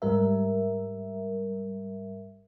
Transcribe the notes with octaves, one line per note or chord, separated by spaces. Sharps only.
G#2 G3 A#4 E5